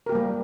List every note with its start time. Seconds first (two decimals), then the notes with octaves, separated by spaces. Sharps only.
0.06 A#4
0.09 G4
0.12 A#3
0.15 G3